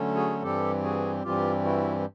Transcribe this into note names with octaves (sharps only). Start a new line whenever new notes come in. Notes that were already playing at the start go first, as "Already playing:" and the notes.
Already playing: D3 F#3 A3 C#4
F#4 G#4
G2 E3 G3 C4 G4 A4
F#4 G#4
G2 E3 G3 C4 F4 G4
E4 F#4